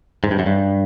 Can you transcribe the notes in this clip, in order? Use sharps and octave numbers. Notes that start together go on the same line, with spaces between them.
G#2
G2
F#2
G2